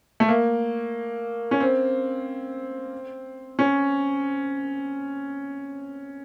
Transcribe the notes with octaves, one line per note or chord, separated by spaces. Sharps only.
A3
A#3
C#4
C4
C#4